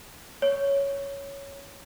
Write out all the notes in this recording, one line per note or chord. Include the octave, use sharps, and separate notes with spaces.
C#5